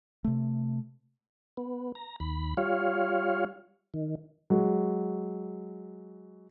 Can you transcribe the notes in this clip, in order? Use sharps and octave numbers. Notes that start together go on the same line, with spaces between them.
C3 A3
B3
A#5
D#2 B5
G3 F4 C#5 F5
D#3
F#3 G#3